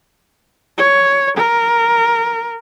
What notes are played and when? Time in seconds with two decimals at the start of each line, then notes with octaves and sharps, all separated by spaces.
0.78 C#5
1.37 A#4